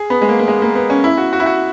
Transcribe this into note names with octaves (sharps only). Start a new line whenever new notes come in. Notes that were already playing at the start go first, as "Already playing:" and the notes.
Already playing: G#4
B3
G#3
A#3
A#3
G#3
A#3
B3
C#4
E4
F#4
F#4
E4
F#4